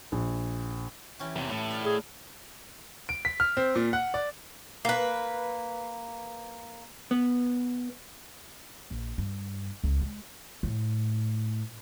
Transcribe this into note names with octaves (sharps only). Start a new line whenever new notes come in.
A#1
E3 C#4 G4
E2 C3
A2
D5 F5
G#4
D7
B6
F6
C4
A#2
F#5
D5
A#3 B4
B3
A#1
G2
C#2
G#3
A2